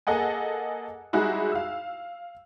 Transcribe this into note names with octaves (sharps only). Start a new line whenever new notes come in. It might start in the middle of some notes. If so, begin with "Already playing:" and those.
A#3 G#4 A4 D#5 F#5 G#5
G3 G#3 D#4 E4 F#4 G#4
F5 E6